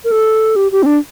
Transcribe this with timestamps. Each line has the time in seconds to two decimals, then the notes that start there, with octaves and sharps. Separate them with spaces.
0.04 A#4
0.11 A4
0.56 G4
0.72 G4
0.83 C4
0.86 D4